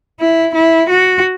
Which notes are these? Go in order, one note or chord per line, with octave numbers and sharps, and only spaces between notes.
E4
E4
F#4